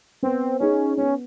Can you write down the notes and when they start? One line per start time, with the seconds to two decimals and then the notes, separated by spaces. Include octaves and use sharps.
0.23 B3 C4
0.60 C#4 D#4 G#4
0.97 B3 C#4